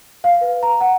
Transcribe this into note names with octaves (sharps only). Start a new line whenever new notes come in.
F5
B4
A#5
F#5